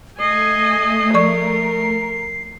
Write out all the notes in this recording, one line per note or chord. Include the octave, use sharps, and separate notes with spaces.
A3 D#5 G#5 C7
F3 A#4 D5 C#6